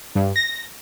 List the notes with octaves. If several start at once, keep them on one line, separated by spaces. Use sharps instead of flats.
G2
A#6